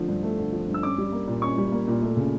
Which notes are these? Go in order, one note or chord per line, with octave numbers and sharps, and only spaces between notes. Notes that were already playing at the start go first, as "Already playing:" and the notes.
Already playing: D3 F3 A3
G2
A3
D3
F3
G2
E6
C#4 D6
G3
A#3
A#2
C#4 C#6
G3
A#3
A#2
A3
C#3